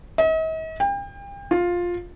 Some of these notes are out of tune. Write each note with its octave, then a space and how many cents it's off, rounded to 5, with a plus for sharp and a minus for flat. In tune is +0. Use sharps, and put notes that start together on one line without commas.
D#5 +45
G5 +35
F4 +10